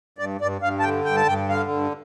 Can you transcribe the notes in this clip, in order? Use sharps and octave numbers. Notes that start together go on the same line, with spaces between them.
G2 D5
G2 D5
G2 F5
A5
D3 G5
G2 G5
A5
G2 G5
D3 F5
G2